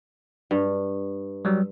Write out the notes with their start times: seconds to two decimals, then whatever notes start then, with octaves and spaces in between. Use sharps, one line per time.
0.51 G2
1.45 F#3 G3